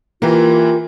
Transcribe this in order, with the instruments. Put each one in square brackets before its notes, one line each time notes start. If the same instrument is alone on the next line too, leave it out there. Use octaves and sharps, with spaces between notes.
[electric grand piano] E3 A#3 [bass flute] F4 [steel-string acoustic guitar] G4 A#4